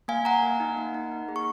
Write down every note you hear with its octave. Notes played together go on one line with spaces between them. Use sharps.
A#3 F5 G#5
A#3 F#5 A#5
A#3
D#4
A#3
D#4
D#4
G#4
C#6